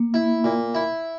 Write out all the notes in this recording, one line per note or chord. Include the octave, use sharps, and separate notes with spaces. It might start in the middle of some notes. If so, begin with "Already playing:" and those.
Already playing: A#3
E4
A#2
E4